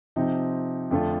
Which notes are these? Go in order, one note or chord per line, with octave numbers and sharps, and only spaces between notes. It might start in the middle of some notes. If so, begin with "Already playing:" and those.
C3 F3 C4 D#4
F2 D3 A3 D4 F4